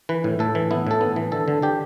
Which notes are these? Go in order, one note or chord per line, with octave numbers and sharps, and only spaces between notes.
E3 B4
A2
A2 A4
E3
B3 E4
A2 A4
B3
E3
D3 A4
D3
D3 G4